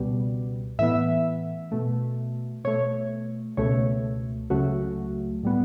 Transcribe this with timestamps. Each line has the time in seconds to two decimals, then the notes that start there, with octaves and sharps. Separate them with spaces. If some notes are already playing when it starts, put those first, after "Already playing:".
Already playing: C#2 B2 G3 B3
0.79 A2 E3 B3 E5
1.72 B2 A3
2.64 B2 A3 C#5
3.57 C#2 B2 A3 C#5
4.50 C#2 C#3 F#3 A3 F#4
5.43 A2 G3 B3